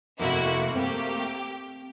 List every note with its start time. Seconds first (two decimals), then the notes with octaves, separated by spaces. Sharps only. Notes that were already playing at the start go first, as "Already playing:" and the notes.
0.19 F2 C3 A3 A#3 E4 F#4
0.75 C4 G4